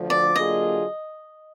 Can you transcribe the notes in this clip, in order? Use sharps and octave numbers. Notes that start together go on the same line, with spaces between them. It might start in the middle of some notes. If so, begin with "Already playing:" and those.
Already playing: D2 D3 F3
D5
D3 F#3 A#3 F4 G#4 D#5